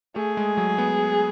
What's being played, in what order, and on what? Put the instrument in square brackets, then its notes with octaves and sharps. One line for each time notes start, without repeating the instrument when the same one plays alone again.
[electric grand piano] A3 [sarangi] G#4
[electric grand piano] G#3
F#3
B3